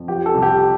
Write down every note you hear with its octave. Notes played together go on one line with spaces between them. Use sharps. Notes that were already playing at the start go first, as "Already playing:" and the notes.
Already playing: F2
F3 G4
A4
C2
G4